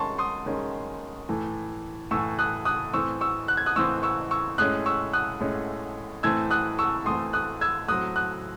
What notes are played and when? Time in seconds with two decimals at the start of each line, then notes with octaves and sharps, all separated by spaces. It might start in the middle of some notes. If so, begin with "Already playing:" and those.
Already playing: D#3 G#3 C#4 A5 C6 C#6
0.18 C6 D#6
0.46 D#3 G#3 C#4
1.29 A2 E3 A3
2.11 A2 E3 A3 C#6 E6
2.39 D#6 F#6
2.65 D#6 F#6
2.93 A2 E3 C4 C#6 E6
3.21 C#6 E6
3.48 F#6
3.57 G#6
3.66 D#6 F#6
3.76 A2 E3 C4 C#6 E6
4.03 C#6 E6
4.31 C#6 E6
4.58 A2 G#3 C#4 D#6 F#6
4.86 C#6 E6
5.13 D#6 F#6
5.41 A2 G#3 C#4
6.23 A2 E3 A3 C4 E6 G#6
6.51 D#6 F#6
6.79 C#6 E6
7.06 A2 E3 A3 C4 C6 D#6
7.33 D#6 F#6
7.61 E6 G#6
7.88 A2 F#3 C4 D#6 F#6
8.16 D#6 F#6